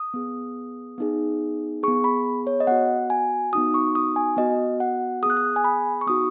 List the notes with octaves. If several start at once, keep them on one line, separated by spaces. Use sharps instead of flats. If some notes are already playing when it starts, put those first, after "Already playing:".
Already playing: D#6
B3 G#4
B3 D#4 G#4
B3 G#4 C#6
B5
C#5
D#5
B3 F#4 F#5
G#5
B3 D#4 F#4 D#6
C#6
D#6
G#5
B3 F#4 D#5
F#5
B3 G#4 D#6 F#6
D#6
G#5
B5
C#6
B3 D#4 F#4 D#6